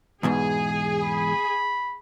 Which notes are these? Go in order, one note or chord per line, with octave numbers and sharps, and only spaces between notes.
E2 G#2 B2 G#4
B5